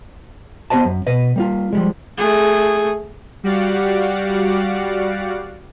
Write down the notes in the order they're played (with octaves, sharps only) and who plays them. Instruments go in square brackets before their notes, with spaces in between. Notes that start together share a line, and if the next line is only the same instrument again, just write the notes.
[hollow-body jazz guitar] B3 G4 C5 D#5 A5
F#2
B2 B4 D#5
G3 A#3 F4
F3 G3 G#3
[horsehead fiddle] A3 G#4
[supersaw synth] G3 F#4 G4 D5 F5 F#5